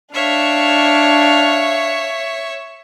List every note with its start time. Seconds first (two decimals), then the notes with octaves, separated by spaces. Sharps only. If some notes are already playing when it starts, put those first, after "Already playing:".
0.14 D4 C#5 E5 F5